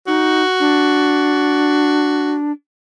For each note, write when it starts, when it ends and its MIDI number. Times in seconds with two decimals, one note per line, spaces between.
0.07 0.43 63
0.07 2.37 66
0.59 2.51 62